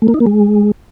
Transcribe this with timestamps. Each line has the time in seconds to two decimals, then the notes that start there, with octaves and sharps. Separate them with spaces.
0.02 A3
0.08 A#3
0.14 D#4
0.20 A#3
0.26 G#3